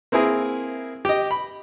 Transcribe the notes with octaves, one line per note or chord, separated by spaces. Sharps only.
A#3 C4 E4 G#4 A#4
G4 D#5
B5